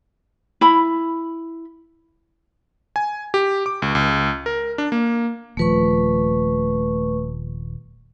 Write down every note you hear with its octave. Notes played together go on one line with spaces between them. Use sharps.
E4 B5
G#5
G4
D6
C#2
C#2
A#4
D4
A#3
D#1 F3 A3 B4 C#6